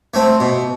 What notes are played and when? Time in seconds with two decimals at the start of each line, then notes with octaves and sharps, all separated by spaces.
0.14 A3 C4
0.40 B2